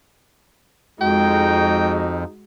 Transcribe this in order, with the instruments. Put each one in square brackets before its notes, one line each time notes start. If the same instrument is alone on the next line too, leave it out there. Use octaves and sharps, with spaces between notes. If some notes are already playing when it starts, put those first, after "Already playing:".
[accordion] F2 [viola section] G#3 F#4 [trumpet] D#4 [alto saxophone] G5